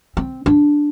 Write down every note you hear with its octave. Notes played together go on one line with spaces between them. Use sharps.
C4
D4